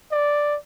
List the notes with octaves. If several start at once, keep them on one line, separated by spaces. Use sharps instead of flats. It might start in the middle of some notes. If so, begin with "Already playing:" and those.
D5